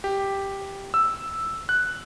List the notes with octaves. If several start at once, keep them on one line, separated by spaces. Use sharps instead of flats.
G4
E6
F#6